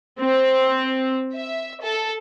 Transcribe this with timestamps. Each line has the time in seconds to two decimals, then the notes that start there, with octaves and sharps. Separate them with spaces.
0.20 C4
1.35 E5
1.82 A4